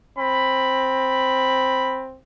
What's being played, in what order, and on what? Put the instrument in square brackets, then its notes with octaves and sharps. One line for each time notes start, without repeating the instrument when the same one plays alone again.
[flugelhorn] C4 [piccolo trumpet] B5